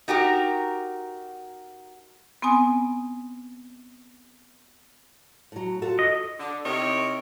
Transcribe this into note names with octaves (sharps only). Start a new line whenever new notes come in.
D#4 F#4 G4 A#4
B3 C4 G#5 D#6
A2 F#3
F4 F#4 A4
D#5
D3
C3 D#4 E4 A#4 C#5